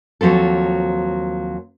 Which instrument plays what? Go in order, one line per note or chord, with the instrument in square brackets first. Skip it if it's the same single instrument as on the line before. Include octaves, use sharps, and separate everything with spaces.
[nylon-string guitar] D#2 F3 F#3 C4 A4